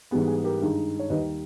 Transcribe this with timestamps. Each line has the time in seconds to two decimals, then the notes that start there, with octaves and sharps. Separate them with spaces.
0.11 G#2 E3 G3 B3 G#4
0.28 G#4
0.44 G4 A#4
0.61 G2 D#3 G#3 D#4
0.99 C#5
1.10 D#2 D#3 G3 B4 D#5